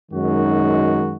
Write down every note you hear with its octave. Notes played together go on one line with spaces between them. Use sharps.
F#2 D#3 G#3 D#4 F#4